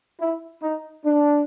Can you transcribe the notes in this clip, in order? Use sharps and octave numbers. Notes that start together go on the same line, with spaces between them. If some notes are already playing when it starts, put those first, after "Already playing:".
E4
D#4
D4